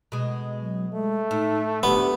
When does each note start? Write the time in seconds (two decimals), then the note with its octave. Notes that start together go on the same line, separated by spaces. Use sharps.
0.12 B2 G#3
0.59 F#3
0.93 G#3 A3
1.31 A2 D#4
1.83 D2 B3 G4